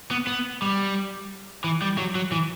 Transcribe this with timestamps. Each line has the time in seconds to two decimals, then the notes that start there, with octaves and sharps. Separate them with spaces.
0.11 B3
0.27 B3
0.62 G3
1.64 E3
1.82 G3
1.98 F#3
2.15 F#3
2.32 E3